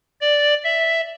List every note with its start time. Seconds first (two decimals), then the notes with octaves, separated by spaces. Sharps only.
0.21 D5
0.64 E5